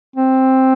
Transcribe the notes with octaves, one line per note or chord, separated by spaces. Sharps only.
C4